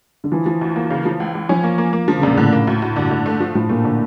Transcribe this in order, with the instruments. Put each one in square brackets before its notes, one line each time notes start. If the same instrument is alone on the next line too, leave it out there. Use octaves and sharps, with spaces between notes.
[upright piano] D3
[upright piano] E3 [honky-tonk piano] F3
[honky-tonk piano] F3
D2
A#3
C#3
F3
C#2
C#2
[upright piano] F3 [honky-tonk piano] C#4
[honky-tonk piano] A#3
A#3
A#3
[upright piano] D3 [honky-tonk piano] F3
[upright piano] C#3
[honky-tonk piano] E2 [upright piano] A#2
[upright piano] A2 [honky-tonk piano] D3
[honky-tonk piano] A#3
D2
D2
[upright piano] G2 [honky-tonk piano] D3
[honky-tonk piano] D3
A3
F3
[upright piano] A2 [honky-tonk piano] F3
[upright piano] A#2 [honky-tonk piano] A3
[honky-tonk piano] D3